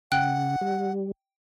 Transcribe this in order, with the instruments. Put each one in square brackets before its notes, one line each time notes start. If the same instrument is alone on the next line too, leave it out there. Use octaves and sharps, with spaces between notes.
[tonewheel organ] C#3 [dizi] F#5 [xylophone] G5 F#6
[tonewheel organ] G3